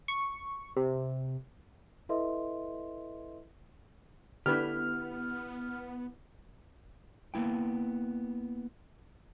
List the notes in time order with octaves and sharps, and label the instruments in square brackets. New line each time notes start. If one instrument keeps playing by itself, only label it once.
[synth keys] C#6
C3
[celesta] E4 A4 B4 D#5 E5 C6
[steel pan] D3 B4 [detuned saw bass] B3 [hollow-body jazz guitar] E4 G4 [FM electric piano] F6
[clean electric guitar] A#3 B3 E4 G5